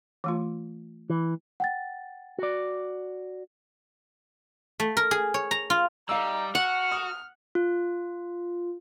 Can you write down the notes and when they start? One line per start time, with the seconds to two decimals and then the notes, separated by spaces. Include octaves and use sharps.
0.24 E3 A3 F4
1.10 E3
1.60 F#5 G5 A6
2.38 F#4 D5
4.80 A3
4.97 A#4
5.11 G#4
5.34 C#5
5.51 A#5
5.70 F4
6.09 G3 D#4 F5 E6
6.55 F#4 F#5 F6
6.92 D#6
7.55 F4